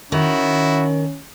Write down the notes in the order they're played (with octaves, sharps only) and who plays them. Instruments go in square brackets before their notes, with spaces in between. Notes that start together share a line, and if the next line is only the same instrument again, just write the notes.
[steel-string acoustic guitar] D#3 [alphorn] C#4 [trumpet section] E4 F#4